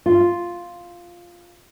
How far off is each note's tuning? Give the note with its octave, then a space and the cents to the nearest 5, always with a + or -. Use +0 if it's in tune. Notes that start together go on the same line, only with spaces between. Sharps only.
F4 +0